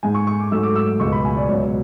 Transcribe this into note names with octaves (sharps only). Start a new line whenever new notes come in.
G#2 G#3 G#5
C#6
C#6
D6
G#2 F#3 A3 E6
D6
E6
D6
C#2 B2 G#3 C#6
B5
G#5
D5
C#2 B2 F#3 C#5